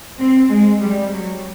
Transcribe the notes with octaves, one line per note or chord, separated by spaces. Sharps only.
C4
G#3
G3
F#3